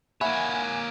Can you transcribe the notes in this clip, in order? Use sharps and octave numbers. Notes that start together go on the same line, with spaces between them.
A#3 C#5 E5 F#5 G#5 B5